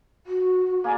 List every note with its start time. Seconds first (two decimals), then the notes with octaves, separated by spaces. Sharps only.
0.26 F#4
0.84 A#3 G#4 D5